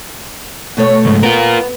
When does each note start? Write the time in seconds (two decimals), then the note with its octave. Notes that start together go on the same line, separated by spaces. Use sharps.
0.77 B2 A3 C#5
1.05 C#2 G#2
1.23 B3 F4 A#4